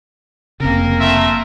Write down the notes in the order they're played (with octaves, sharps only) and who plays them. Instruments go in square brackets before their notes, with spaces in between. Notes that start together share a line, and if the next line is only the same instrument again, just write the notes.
[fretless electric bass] F1 C#3 [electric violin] A#3 A#4 [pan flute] C4
[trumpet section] A3 F4 E5